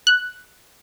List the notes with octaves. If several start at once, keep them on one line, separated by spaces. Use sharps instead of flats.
F#6